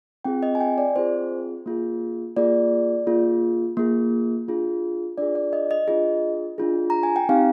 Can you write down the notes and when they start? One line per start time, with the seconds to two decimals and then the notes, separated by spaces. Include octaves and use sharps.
0.25 C4 F4 G#4 G5
0.43 D#5
0.55 G#5
0.61 G5
0.78 D5
0.96 C4 F4 G#4 C5
1.66 A#3 F4 G#4
2.37 A#3 F4 G#4 D5
3.07 A#3 F4 G#4
3.77 A#3 F4 G#4
4.48 D4 F4 G#4
5.18 D4 F4 G#4 D5
5.35 D5
5.53 D#5
5.71 D#5
5.88 D4 F4 G#4 D#5
6.58 D4 F4 G#4
6.90 A#5
7.03 G#5
7.16 G5
7.29 C4 D#4 G4 F5